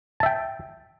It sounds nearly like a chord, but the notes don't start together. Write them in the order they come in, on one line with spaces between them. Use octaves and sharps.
A5 E5 G5